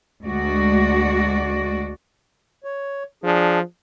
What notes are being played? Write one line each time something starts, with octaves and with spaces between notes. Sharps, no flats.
D2 G#3 F#4 D5
C#5
F3 D4 G#4